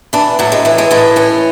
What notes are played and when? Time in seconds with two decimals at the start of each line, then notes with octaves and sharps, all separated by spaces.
0.13 E3 D4
0.39 A2 F#3
0.52 G#3
0.65 E3 A3
0.78 G#3
0.91 A2 G#3
1.16 E3 C#4